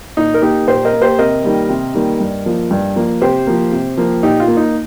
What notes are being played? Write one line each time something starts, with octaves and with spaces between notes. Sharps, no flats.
A#2 D#4
A#4
A#3 D#4 G4
A#2 G4 C5
A#4 D#5
A#3
G4 C5
C3 A#4 D#5
D#3 G3 A#3
C3
D#3 G3 A#3
G2
F3 A#3
G2
F3 A#3
C3 G4 C5
F3 A#3
C3
F3 A#3
A#2 D#4 G4
F4
A#3
D#4